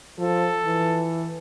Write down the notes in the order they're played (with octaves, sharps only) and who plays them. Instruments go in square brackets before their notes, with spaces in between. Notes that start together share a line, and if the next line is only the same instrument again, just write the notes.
[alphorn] F3 [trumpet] A4
[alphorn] E3